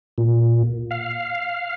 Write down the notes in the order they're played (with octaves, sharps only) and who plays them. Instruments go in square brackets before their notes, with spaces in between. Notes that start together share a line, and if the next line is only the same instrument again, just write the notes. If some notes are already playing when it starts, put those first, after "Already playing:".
[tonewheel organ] A#2
F5